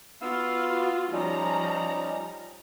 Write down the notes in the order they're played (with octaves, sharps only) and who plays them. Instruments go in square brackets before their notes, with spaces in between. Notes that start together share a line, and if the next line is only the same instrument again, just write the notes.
[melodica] B3 F5 E6 [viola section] F4 F#4
[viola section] F3 A#5 [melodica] G3 C#4 D#4